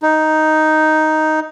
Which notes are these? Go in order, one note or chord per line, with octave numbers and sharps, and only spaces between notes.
D#4